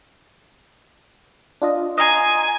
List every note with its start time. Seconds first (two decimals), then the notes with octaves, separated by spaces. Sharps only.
1.62 D4 F4 D#5
1.98 D#5 G#5 A#5 C6